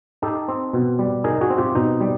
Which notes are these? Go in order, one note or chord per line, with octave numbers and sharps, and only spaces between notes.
D#4 G4 A4
C4
B2
G3
D#4 G#4 A#4
F#4 G#4
C4
F4 G4
B2 D#4
G3